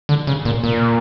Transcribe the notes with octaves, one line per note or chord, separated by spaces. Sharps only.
D3
C#3
A#2
A#2